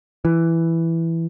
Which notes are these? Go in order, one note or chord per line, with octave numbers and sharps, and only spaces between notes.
E3